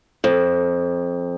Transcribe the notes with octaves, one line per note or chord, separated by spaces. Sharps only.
F2